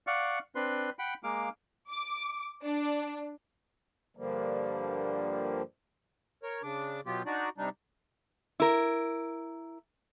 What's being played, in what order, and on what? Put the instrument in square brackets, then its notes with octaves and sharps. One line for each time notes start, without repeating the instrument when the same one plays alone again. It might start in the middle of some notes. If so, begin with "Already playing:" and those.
[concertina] D5 F5 F#5 C#6
C4 D4 B4 C6
F#5 G5 B5
G#3 A#3 F5 D6
[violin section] D6
D4
[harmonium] G2 D3 F3 G3 A#3
[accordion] A#4 C#5
C#3 D4 D6
B2 F#3 B3 F4 G4
D4 D#4 F#4 D5
C3 G3 D4 D#4
[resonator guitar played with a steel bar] E4 A#4